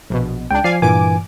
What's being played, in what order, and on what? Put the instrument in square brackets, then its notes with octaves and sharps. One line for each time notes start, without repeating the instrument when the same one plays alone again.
[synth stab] A#1 B2
[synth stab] C#2 D4 [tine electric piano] G5
[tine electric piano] F3 C7 [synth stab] D5 F5 G#5
[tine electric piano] G2 E3 G#5 [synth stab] A#2 D6 D7